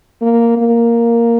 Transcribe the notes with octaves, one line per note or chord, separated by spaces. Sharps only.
A#3
A#3